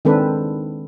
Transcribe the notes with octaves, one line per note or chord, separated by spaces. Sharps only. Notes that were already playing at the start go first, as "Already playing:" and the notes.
D#3 G#3 C4 D4 A4 B4